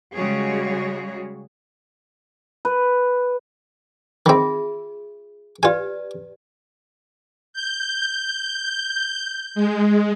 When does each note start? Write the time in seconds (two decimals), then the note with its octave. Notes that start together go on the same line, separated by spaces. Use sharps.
0.14 C#3 G3 G#3 F#4 G#4 C#5
2.65 B4
4.26 D#3 C4 F4 G#4 E5
5.63 F4 G4 B4 D5 G#5
7.53 G6
9.55 G#3